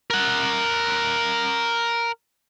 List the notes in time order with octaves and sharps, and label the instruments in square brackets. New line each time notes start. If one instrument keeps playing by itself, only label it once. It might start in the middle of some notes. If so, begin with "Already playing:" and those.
[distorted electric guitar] A#4 F#5